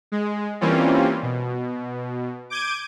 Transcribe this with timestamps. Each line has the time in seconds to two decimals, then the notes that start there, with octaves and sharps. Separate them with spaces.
0.12 G#3
0.61 E3 G3 A#3 C4 C#4 F4
1.23 B2
2.50 D6 G6 G#6 D7 D#7